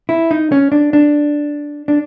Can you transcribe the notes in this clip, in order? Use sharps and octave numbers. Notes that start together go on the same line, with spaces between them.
E4
D#4
C#4
D4
D4
D4